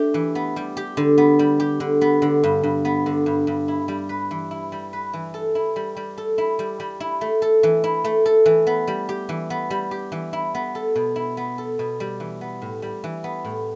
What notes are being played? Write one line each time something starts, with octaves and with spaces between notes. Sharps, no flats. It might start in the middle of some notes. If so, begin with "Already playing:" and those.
Already playing: A3 D4 G4
E3
B3
G3
G4
D3
B3
G3
G4
D3
B3
D3
G2
G2
B3
D3
G2
G2
E4
G3
B4
E3
E4
G3
B4
E3
A4
E4
G3
G3
A4
E4
G3
G3
E4
A3
A4
E3
E4
A3
A4
E3
B3
G3
G4
E3
B3
G3
G4
E3
E4
B3
A4
B2
E4
B3
A4
B2
G3
E3
B3
A2
G3
E3
B3
A2